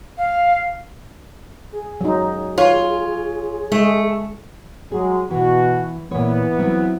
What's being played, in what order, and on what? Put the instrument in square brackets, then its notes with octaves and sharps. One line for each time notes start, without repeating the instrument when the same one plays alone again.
[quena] F5
[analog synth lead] G#4
[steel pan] F#3 D#4
[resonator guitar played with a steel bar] F4 [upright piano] C#5
[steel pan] G#3 [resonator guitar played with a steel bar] A3
[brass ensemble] F#3 G#3 [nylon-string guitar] G#4
[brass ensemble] B2 F#4 [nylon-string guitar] E3
[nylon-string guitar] A#2 C#5 [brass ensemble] E3 B3
[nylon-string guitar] F#3 C4 E4